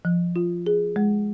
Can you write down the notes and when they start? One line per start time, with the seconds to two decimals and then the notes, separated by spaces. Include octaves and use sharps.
0.05 F3
0.36 F4
0.66 G#4
0.96 G#3